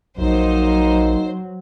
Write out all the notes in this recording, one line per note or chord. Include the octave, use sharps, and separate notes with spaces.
A#1 F#3 A#3 D#4 C5